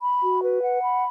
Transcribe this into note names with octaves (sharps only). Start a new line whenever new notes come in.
B5
F#4
B4
F#5
B5